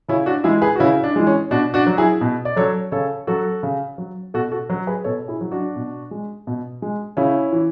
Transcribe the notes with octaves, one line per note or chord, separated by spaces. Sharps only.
C#3 C#4 E4
D4 F#4
E3 G#3 E4 G#4
G#4 B4
F#4
C#3 C#4 E4
D4
E3 G#3
C#4
B2 D4 F#4
D4 F#4
F#3
E4 G#4
B2
D5
F#3 A4 C#5
C#3 A4 C#5
F#3 F#4 A4
C#3
F#3
B2 F#4 A4
F#4 A4
F#3
G#4 B4
B2 A4 C#5
E4 G#4
F#3
D4 F#4
B2
G#3
B2
G#3
C#3 C#4 E4
E3